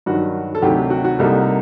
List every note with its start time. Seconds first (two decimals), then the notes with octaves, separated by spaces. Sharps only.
0.06 G2 D#3 F#3 F#4
0.55 A4
0.62 D2 C3 D#3 F#3 A3 G4
0.90 F#4
1.05 F#4
1.19 C2 C3 G3 A#3 D#4 A4